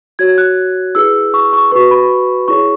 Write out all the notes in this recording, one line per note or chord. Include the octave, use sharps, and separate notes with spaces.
F#4 C#5 G#6
F#6
E4 G#4 B4 E6
C#6
C#6
F#4 B4 C#6
B5
E4 G#4 C#5 C#6